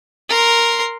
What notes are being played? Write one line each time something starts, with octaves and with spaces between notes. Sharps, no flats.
A#4 C6